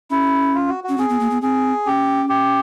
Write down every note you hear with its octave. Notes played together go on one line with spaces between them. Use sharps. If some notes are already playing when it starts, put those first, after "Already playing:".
C#4 E4
F4
F#4
C#4 F#4
C4 G#4
B3
A#3
B3
C4 G#4
C#4 G4
G4